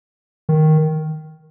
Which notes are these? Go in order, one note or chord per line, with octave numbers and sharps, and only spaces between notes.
D#3